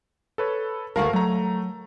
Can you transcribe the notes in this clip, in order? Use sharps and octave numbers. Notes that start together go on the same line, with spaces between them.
A4 B4 C#5
D2 F#4 A#4 F5 A5
F#3 A3 A#5